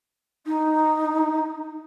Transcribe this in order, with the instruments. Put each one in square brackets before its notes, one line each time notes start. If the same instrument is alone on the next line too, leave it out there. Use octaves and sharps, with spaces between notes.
[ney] D#4